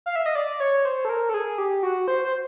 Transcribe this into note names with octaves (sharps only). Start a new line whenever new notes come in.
F5
E5
D#5
D5
C#5
C5
A4
A#4
A4
G#4
G4
F#4
C5
C5